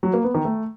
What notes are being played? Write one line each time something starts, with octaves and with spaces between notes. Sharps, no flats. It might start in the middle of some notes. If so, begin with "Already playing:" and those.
F#3
A#3
B3
D#3
A3